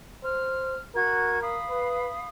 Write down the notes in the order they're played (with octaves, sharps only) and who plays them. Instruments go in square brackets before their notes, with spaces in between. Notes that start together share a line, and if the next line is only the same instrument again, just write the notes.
[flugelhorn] C5 [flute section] F6
[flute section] F#4 G#6 [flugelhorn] A#4
[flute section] F5 B5 D#6
[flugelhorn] B4